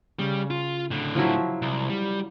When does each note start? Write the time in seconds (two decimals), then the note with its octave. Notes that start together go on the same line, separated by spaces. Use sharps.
0.19 C#3 G3
0.50 F4
0.91 A2 D3
1.15 F3 F#3 E4
1.62 C2
1.89 G3